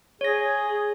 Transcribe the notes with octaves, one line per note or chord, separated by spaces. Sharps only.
G#4 C#5 A#6